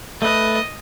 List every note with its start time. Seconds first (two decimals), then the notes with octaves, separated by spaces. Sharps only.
0.22 A3 B4 D#5